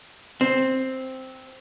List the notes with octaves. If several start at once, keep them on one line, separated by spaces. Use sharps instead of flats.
C4